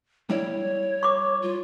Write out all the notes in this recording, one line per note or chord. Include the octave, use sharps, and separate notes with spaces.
G3 E4 C#5 D5
C#6 D6
F4